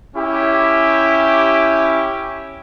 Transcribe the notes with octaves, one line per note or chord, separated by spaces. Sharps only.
C#4 E4 G4